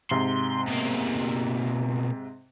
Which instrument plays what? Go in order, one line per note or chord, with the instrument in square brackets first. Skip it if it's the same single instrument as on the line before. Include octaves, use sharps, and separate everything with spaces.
[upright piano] G#2 C3 [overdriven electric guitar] C6
[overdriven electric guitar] B2 A#3